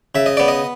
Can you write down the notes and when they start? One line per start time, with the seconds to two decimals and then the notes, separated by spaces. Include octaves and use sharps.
0.15 C#3 E5
0.26 D#5
0.37 B3 D5
0.48 D#5